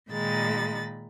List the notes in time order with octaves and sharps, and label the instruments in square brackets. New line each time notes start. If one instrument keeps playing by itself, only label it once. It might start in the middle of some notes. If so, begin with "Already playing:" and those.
[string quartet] A#2 D#3 G#3 B5 A6